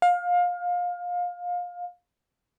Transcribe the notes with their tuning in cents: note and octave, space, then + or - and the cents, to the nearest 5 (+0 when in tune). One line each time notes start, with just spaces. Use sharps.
F5 +25